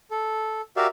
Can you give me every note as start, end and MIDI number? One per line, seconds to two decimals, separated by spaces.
0.11 0.61 69
0.77 0.87 66
0.77 0.87 67
0.77 0.87 70
0.77 0.87 74
0.77 0.87 76
0.77 0.87 77